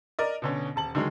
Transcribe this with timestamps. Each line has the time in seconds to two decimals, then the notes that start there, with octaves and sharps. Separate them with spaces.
0.19 A#4 D5 D#5
0.42 B2 D3 C#4
0.76 D#1 A5 F#7
0.95 D3 D#3 F#3 G#3